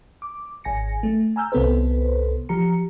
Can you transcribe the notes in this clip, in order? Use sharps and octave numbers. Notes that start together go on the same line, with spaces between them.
D6
G#1 G#5 A#6 C#7
A3
G#5 A#5 E6 F6 G6
C2 C3 B3 A4 B4 C5
F3 G4 A#5 C#7